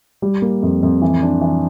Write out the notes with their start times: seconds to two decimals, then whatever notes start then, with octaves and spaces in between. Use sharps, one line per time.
0.22 G3
0.42 A#3
0.63 F2
0.83 F2
1.02 E3
1.22 D4
1.41 E3